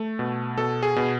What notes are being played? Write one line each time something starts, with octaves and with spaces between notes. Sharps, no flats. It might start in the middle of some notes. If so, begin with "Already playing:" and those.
Already playing: A3
B2
B2 A4
G#4
B2